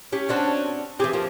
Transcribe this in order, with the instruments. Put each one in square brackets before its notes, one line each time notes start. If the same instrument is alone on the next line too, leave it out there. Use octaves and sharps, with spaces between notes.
[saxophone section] C#4 [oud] G4
[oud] C4 D4 F#4
[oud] E3 G4 [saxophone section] C4 G#4
[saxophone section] F2 A#3 [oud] F3